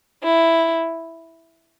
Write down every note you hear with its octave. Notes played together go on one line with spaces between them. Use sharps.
E4